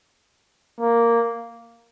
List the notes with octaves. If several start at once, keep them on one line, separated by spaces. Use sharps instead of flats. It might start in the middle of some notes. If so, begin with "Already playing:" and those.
A#3